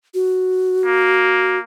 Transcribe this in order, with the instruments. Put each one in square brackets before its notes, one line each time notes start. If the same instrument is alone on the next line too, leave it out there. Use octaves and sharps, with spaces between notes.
[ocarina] F#4
[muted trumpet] A#3